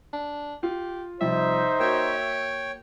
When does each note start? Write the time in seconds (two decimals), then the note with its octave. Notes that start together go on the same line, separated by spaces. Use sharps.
0.13 D4
0.63 F4 G4
1.21 C3 F3 G3 D#4 C5 E5
1.79 A#3 F#4 C#5 G5